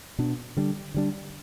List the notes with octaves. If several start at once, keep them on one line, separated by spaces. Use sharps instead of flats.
B2 B3 D4
D3 G3 D4
D3 G3 D4